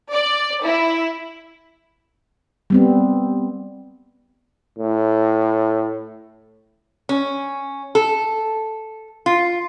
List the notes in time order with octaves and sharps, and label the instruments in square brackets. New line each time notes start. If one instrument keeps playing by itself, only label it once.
[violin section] D5
E4
[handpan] G3 B3 C4
[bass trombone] A2
[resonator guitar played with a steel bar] C#4
A4
F4